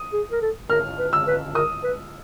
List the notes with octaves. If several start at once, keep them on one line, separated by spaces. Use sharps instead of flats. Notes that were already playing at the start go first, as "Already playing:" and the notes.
Already playing: D#6
G#4
A#4
A4
A#4 F6
B4
E6
B4
A#4 D#6
B4